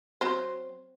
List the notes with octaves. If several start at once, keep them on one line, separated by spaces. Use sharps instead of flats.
F#3 C4 C5